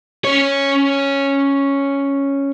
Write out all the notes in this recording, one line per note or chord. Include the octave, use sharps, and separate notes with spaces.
C#4 C#5